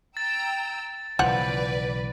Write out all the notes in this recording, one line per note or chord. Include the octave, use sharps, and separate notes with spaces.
G5 A#5 E6 A6
B1 C#3 E3 F3 B4 C5 D5 F#5